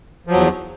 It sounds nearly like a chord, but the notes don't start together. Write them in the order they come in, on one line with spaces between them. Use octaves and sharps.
F3 F#3 E2